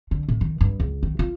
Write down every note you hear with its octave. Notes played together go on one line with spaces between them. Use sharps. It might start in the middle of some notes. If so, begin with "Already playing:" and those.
D3
A2
D#3
G2
C#2
D#3
F4